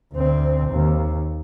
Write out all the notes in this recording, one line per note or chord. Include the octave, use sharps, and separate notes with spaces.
D2 C4
D#2